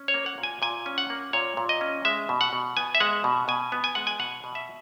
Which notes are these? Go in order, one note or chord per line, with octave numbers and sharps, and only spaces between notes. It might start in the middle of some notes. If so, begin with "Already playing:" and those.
Already playing: C#4
C#5
A#3
F#5
A#2
G#5
A#2 G#5
C#4
F#5
A#3
A#2 C#5
A#2
D#5
C#4
G#3 E5
B2
F#5
B2
B3 G#5
E5
G#3 F#5
B2
B2 G#5
B3
G#5
G#3 F#5
G#5
B2 F#5
B2
E5